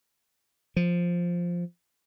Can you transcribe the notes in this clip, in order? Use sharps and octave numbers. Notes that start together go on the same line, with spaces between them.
F3